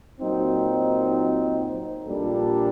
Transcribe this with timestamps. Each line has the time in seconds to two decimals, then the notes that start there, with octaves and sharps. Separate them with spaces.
0.21 A#2 F#3 C4 D#4
2.06 A#1 A#2 G3 D4 A4